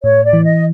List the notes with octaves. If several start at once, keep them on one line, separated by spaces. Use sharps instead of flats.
A2 C#5
D5
E3
D#5